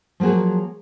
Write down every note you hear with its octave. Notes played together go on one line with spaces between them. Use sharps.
F3 F#3 A#3 F#4 G#4